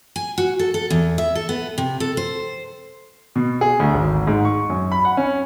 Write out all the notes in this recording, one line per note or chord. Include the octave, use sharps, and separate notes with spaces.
G#5
F#4
A4
A4
E2
E5
A4
B3
C3
A4
C5
B2
G#4
D2
G#1
G#2
C#6
F#2
B5
F#5
C#4